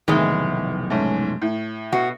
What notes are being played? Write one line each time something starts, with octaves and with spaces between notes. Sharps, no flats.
F1 B1 A2 D#3 E3 G#3
G#2 A3 C#4
A2
B2 F#4